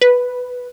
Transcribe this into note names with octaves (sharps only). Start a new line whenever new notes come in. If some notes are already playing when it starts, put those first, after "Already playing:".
B4